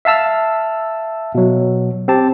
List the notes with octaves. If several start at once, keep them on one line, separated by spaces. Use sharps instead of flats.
E5 F5 A5 E6 F6
B2 F#3
C4 G4 A5